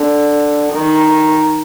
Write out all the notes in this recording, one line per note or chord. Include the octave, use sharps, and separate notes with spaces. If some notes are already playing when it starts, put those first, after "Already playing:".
Already playing: D3
D#3